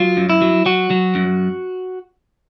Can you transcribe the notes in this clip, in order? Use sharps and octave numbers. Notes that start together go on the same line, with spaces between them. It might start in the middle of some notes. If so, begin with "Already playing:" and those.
Already playing: F#3 F4
F#2
E4
F#3
F#3 F#4
F#3
F#2